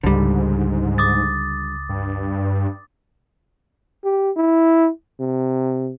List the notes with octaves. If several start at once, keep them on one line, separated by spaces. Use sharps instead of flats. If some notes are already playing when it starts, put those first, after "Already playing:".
C#2 G#2 D3 G3
D6 D#6 A6
G2
G4
E4
C3